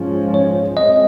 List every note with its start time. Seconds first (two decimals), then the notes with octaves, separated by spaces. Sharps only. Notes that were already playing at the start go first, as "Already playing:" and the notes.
Already playing: G#2 F3 G#3 C#4
0.34 C#5
0.77 G#3 C4 D#5